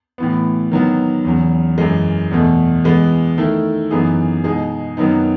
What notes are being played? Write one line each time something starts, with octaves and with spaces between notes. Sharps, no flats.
A2 E3 B3
D#3 F#3 B3
E2 C#3 F#3
F#2 E3 G#3
E2 B2 A3
E3 G#3 B3
D#3 A3 E4 A4
F#2 E3 B3 D#4 G#4
B2 G#3 D#4 G#4
F#2 D#3 F#3 B3 D#4